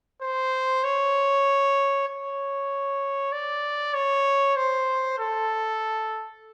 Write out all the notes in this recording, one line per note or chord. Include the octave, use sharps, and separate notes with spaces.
C5
C#5
C#5
D5
C#5
C5
A4